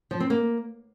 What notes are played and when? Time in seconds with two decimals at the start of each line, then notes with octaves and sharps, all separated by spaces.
0.11 F3
0.20 C4
0.30 A#3